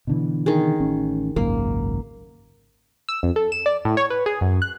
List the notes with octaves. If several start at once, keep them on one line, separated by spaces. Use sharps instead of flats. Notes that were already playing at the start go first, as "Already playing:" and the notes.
B2 D3 E3
D#3 G#4
A1 C#4
G#1 C#2 F#2 A#3
E6
F2
A4
E7
D5
A2
C#5
B4
G#4
F#2
F#6